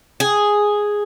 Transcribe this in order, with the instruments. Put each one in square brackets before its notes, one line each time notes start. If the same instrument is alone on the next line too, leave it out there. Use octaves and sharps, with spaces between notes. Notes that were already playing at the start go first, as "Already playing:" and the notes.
[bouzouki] G#4